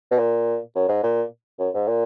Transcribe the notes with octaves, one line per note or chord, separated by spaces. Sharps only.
B2
A#2
F#2
G#2
A#2
F#2
G#2
A#2